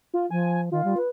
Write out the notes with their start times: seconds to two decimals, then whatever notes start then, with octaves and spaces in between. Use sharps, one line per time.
0.14 F4
0.31 F3 G#5
0.72 D#3 F4
0.84 G3
0.97 B4